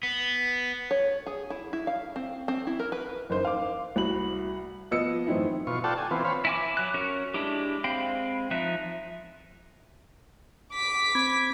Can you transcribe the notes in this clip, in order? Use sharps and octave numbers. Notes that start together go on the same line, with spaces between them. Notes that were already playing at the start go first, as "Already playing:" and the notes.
B3
C#5
G#4
E4
E4
F5
C4
C4
E4
A#4
B4
F#1 A#3 D#4 C5
F5 D6
C2 F#4 B5 F#7
F3 B3 D#5 E6 C#7
F#2 A2 E3 C4 D#4 E4
B2 F4 C#6
F4 A4 D5 F#5 G5 A5
G#5
E3 B3 C4 F4
C4 C#5 F5 B5
E4 G#5 D6
F#3 F#6
C#4 F#4 A#4
G#3 D4 E4 G4
G#3 C4 F5 G5 B5
F3 D#4 E5 F#6
D6 B6
C4 B5 G#6